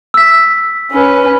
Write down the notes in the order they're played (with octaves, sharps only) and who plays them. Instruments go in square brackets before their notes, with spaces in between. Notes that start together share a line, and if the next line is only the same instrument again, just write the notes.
[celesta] E6 B6
[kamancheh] C#4 B4